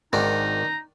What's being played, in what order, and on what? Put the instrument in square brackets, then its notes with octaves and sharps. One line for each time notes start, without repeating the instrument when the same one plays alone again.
[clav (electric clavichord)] G#1 [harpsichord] D#3 D4 [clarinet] D#4 [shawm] A#5